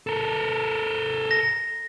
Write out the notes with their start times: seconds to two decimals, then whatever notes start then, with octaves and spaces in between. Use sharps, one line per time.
0.07 A4 A#4
1.31 A#6